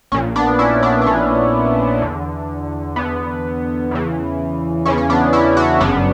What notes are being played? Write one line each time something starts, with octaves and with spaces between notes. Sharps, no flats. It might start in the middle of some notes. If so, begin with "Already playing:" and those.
A#1 A#2 C#4
B3 D4
C#4 E4
B3 D4
D4
A#1 A#2 C#4
E2 D3
E2 D3 B3
E2 C#3 E3
E2 C#3 E3 C#4
C#4
B3 D4
C#4 E4
D4 F#4
G1 F#2 C#3 B3 D4